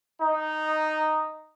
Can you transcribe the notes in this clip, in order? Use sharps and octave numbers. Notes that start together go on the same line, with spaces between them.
D#4